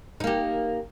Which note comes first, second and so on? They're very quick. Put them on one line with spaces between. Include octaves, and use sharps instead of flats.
D#4 A#3 G4